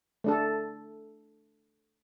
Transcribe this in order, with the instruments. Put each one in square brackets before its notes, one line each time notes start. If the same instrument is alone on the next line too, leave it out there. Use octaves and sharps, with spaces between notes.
[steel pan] A3 D4 A4